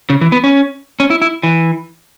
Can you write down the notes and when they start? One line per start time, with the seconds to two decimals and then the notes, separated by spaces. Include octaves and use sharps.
0.10 C#3
0.21 E3
0.32 B3
0.44 C#4
1.00 C#4
1.10 E4
1.22 E4
1.43 E3